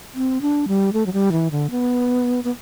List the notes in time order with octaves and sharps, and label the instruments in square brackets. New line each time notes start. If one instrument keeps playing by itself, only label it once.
[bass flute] C4
D4
G3
A3
F#3
G3
E3
D3
B3
B3